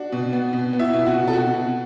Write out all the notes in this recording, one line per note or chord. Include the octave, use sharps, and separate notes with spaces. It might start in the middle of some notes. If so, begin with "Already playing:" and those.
Already playing: D4 F#4
B2
B3
B2
B3
E4 E5
B2
F#4
B2
A4
B2 F#4
B2